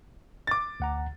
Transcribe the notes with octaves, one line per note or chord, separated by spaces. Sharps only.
D6 A6
D2 F#5 A#5